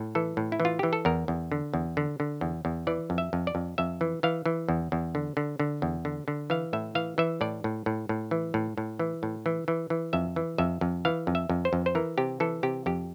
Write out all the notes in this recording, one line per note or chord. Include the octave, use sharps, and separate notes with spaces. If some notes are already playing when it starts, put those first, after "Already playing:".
Already playing: A2
E3 A4
A2
E4
E3
F4
E3 G4
A4
E2 A#4
E2
D3
E2
D3
D3
E2
E2
E3 D5
F2
E5
F2
D5
F2
F2 E5
E3
E3 F5
E3
E2
E2
D3
D3
D3
E2
D3
D3
E3 F5
A2 E5
E3 F5
E3 E5
A2 D5
A2
A2
A2
E3
A2
A2
E3
A2
E3
E3
E3
F2 E5
E3
F2 E5
F2
E3 F5
F2
E5
F2
C5
F2
C5
E3 A#4
C3 G4
E3 A4
C3 G4
F2 G4